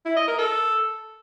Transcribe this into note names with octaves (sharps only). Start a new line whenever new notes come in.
E4
D#5
A#4
A4